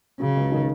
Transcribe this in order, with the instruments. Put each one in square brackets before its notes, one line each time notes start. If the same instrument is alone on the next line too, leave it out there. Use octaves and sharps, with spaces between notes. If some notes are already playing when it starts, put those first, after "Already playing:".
[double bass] C#3 [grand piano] F#3
[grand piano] C#2
D#3